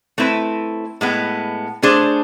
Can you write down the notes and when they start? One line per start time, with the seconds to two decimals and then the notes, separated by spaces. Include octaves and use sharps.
0.18 A3 C4 E4 B4
1.01 A2 G#3 B3
1.82 A3 D4 G#4 C5